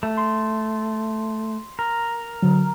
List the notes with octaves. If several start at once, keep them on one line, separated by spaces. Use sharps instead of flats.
A3
C6
A#4
D3 F#3